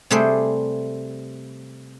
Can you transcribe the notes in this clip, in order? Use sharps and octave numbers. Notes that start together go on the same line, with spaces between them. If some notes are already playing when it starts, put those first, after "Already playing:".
C3 G3 A3 G#4 C5